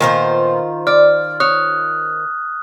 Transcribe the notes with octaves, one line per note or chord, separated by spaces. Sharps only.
A#2 D#3 B3 F4 C5
D5 F6
C#5 D#6 F#6